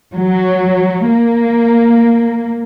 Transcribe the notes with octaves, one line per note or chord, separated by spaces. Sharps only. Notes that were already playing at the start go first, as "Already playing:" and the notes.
F#3
A#3